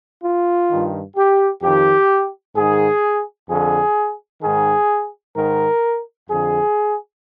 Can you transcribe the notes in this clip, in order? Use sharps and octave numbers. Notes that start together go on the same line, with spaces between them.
F4
G2 D#3
G4
F2 D#3 G4
G#2 D#3 G#4
F2 D3 G#4
G#2 D#3 G#4
G#2 D#3 A#4
F2 D3 G#4